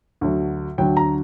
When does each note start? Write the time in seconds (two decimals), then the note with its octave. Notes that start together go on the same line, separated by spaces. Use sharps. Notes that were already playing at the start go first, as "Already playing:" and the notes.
0.21 D2 D3 F#3
0.78 D2 D3 F#3 G5
0.97 A#5